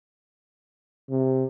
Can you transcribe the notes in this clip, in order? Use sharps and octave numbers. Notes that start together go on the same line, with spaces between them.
C3